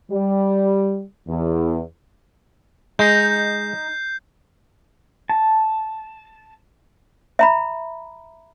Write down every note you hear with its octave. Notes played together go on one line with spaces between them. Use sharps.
G3
E2
G#3 D#4 G6 C7
A5
E5 A#5 B5